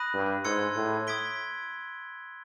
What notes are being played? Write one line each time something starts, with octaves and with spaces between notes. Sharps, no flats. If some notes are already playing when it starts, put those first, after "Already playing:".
Already playing: B5 D#6 F#6 A#6 D#7
G2
G#2 C6 E6 G#6 C#7
A2
D#6 G#6 B6 D7 G7